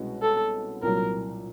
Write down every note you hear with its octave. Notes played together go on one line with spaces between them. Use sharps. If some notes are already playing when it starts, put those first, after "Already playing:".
Already playing: C2 B2 G#3 C#4 F#4
A4
C2 A#2 F#3 A#4